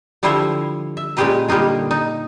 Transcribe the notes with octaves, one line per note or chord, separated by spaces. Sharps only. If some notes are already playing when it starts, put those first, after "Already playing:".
D3 F3 G3 E4 C5 C#5
E5
A#2 G#3 C#4 G4 B4 A#5
D3 G3 A#3 D#4 F4
D#4